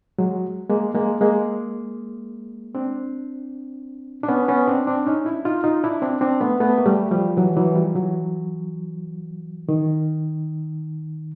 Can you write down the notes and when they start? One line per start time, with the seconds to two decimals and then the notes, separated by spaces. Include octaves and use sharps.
0.18 F#3 G#3
0.70 G#3 A#3
0.95 G#3 A#3
1.21 G#3 A#3
2.75 C4 D4
4.23 D4
4.28 B3 C#4
4.48 B3 C#4
4.68 C4 D4
4.87 C4 D4
5.07 C#4 D#4
5.25 D4 E4
5.45 D#4 F4
5.64 D#4 F4
5.84 D4 E4
6.02 C4 D4
6.21 C4 D4
6.40 A3 B3
6.60 A3 B3
6.78 A#3
6.86 G3 A3
7.11 F3 G3
7.37 E3 F#3
7.56 E3 F#3
7.75 F3 G3
7.95 E3 F#3
9.69 D#3